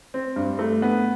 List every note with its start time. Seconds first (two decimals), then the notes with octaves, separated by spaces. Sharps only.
0.14 C4
0.36 G2
0.59 A3
0.82 B3